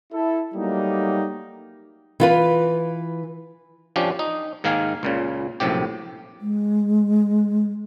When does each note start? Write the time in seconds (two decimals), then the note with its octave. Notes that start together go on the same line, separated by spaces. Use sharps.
0.12 E4 A4
0.55 F#3 G3 A3 A#3 D#4
2.20 E3 F4 B4
3.96 F3 C#4 D4 G4
4.19 D#4
4.64 G#2 D#3 A#3 F5 G#5
5.03 C#2 A#2 C#3
5.60 A#1 F#2 A2 C3 G4
6.41 G#3